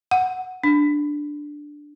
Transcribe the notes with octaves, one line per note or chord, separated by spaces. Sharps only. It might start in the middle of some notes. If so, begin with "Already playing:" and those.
F#5
D4